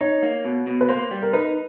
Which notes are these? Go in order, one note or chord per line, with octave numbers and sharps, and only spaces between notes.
D#4 C#5
A#3
B2
B2
B4
A#3 C5
G3
A#4
D#4 B4